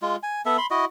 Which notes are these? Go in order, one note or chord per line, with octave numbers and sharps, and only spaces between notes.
G#3 F4
G#5
B3 A4 E5
B5 C6
E4 F#4 D#5